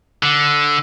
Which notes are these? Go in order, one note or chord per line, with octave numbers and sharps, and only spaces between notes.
D3